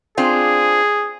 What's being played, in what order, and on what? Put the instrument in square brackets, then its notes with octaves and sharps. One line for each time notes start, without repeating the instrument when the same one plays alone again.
[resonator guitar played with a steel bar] C4 D4 F4 [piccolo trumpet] G#4